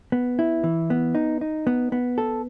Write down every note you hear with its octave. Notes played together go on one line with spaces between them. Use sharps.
B3
E4
E3
B3
D#4
D#4
B3
B3
A4